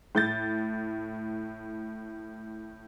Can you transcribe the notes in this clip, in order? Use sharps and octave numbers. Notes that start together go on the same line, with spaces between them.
A2 G6 A6